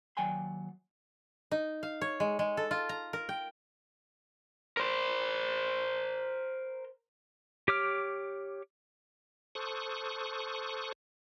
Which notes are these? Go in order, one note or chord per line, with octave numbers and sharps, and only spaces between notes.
D#2 F#3 D5 G5 G#5 C6
D#4
F5
C#5
G#3
G#3
A4
F4
A#5
A#4
G5
A#4 C5
G4 C#5 D6 F6
A4 C5 C#6 D#6 F#6